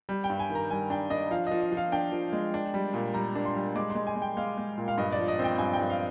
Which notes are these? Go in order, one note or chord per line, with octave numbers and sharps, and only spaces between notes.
G3
G5
G2
G#5
D#3
A#5
G3 G#5
D4 G5
D4 D#5
F3 F5
F3 D#5
D#5
F3
F5
D4 G5
F3
G#3
D4
G3
A#2
G3 A#5
D4
C6
G3
G#3 D6
C6
G#3
G#5
G#3
G5
G#3 F5
G#3
A#2
F5
G2 D#5
D5
F3
D#5
C4
G5
G2 G#5
G5
G2
F5